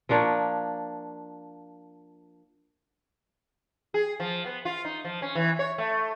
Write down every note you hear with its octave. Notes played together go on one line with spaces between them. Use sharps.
F3 A#3 D4 C#5
G#4
F3
B3
F4
D#4
F3
C#4
E3
C#5
A3